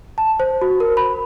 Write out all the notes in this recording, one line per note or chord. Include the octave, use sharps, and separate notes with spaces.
A5
C5
F#4
A#4
B5